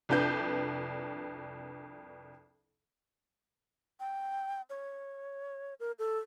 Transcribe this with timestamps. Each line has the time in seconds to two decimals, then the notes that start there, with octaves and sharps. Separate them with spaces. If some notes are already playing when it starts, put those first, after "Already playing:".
0.09 C2 F2 D4 B4 G6
4.00 G5
4.70 C#5
5.80 A#4
5.99 A4